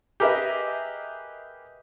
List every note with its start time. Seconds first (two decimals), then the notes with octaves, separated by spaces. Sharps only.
0.20 G4 G#4 A#4 B4 D#5 E5